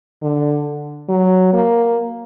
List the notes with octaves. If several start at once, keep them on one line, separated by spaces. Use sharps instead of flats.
D3
F#3
A#3